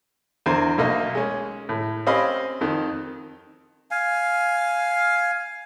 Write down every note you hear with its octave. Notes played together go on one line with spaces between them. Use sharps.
E2 D3 A#4 C5
B1 A3 A#3 D#5
G#3 C#4
A2
C4 C#4 G4 D#5 F5 B5
F2 D#3
F5 G#5